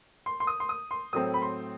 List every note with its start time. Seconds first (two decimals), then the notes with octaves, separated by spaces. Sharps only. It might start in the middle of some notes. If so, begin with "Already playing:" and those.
0.26 C6
0.40 C6
0.47 D#6
0.60 C6
0.69 D#6
0.91 C6
1.13 A2 F#3 A3 C4 D#6
1.34 B5
1.42 C6